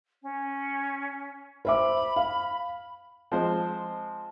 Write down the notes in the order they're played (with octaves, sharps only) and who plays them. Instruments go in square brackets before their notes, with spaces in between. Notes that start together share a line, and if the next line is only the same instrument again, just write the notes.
[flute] C#4
[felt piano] C5 E5 D6 [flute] B5
[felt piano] F5
[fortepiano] F3 G#3 C4 C5